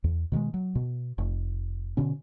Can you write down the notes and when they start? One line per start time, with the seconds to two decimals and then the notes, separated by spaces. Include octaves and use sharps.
0.04 E2
0.32 B2 D#3 E3 G#3
0.54 F#3
0.75 B2
1.18 F1
1.97 B2 D3 C#4